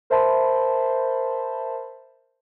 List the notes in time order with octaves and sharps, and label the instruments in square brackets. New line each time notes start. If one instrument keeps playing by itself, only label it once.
[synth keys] A#4 C5 E5 A5 B5 C6